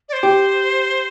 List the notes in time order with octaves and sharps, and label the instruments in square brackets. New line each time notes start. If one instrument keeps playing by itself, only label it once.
[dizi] D5
C5
[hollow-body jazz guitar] G4